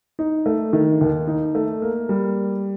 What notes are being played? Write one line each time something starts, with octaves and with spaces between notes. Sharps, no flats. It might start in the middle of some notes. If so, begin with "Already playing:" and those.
D#4
A3
D#3
D#2
D#4
A3
A#3
G3